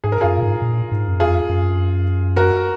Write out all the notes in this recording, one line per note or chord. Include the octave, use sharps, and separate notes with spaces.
G#2 G#4
A#4
F#2 F4 G#4
A#2
G#2
A#2
G#2
F#2
F2 F4 G#4
F#2
F#4 A#4